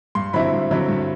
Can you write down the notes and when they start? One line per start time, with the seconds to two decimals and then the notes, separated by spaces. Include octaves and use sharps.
0.15 G2 C6
0.33 D3 F#3 C4 E4 B5
0.53 G2
0.71 D3 F#3 C4 E4
0.89 G2